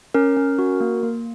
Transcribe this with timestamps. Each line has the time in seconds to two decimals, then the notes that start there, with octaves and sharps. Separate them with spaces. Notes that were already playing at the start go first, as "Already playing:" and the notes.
0.14 C#4 A#4
0.37 C#4
0.59 F#4
0.80 A#3
1.03 A#3